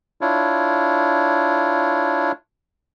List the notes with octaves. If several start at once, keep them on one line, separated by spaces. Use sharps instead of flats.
D4 E4 F4 C#5